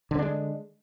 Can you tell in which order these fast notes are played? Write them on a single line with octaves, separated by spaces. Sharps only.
D3 C4 D4 G#3